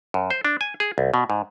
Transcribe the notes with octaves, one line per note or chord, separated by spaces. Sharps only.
F#2
C5
D4
G#5
G#4
C2
B2
G#2